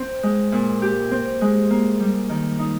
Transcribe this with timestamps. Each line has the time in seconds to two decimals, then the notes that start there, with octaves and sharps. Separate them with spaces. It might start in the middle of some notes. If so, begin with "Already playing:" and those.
Already playing: C4
0.23 G#3
0.52 A#2
0.82 G4
1.11 C4
1.41 G#3
1.70 A#3
2.00 G3
2.29 D#3
2.59 D#4